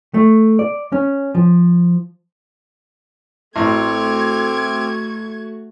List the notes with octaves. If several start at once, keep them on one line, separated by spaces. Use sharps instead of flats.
A3
D5
C#4
F3
A1 A3 C4 F#4 C#6 D6 F6 G#6